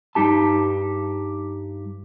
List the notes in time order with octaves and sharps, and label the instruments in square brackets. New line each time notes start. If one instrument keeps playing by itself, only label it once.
[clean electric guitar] G2 D#4 G4 A5